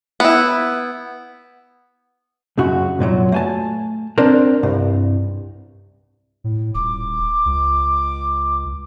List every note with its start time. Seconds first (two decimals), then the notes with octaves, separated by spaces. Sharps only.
0.20 B3 E4
2.58 C#2 F#2 C#3 F#4
2.99 C2 F#2 A#2 F#3
3.32 A3 G#5 A5
4.18 C4 D4 A#4 C5
4.63 C2 G2
6.44 A2
6.74 D#1 D6
7.46 C#2